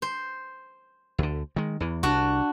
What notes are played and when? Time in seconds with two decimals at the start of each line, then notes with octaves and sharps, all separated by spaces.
0.02 C5
1.18 D2 D3
1.56 D#3 G#3
1.80 E2 E3
2.03 C2 D4 F#4